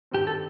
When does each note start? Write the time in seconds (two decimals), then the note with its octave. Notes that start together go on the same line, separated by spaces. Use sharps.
0.11 G2 D#3 G3 C4 G4
0.27 A4